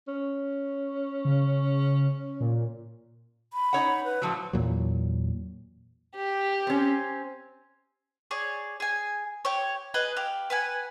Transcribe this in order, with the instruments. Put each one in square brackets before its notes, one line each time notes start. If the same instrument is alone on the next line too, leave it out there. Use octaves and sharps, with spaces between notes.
[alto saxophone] C#4
[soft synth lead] C#3
A#2
[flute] B5
[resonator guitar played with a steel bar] D#4 C#5 F#5
[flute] B4
[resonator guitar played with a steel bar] A2 F3 F#3
[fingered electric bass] E2 A#2 F#3
[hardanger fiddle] G4
[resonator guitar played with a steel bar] C4 C#4
[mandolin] G#4 C#5 D5
G#4 G#5
G4 C#5
G#4 B4 D#5
G4 F5
B4 F#5 G#5